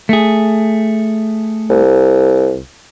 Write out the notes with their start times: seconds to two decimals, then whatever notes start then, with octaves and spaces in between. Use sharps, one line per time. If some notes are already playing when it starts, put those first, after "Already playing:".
0.09 A3 G#4
1.70 C2